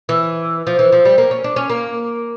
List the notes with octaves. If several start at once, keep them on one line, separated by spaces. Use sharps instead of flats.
E3
F3
E3
F3
G3
A#3
C#4
D4
C#4
A#3